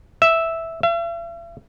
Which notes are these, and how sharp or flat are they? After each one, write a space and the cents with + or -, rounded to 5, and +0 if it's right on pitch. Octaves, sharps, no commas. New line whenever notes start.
E5 -5
E5 +45